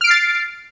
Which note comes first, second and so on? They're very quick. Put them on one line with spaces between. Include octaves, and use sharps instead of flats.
F6 D7 C7 A6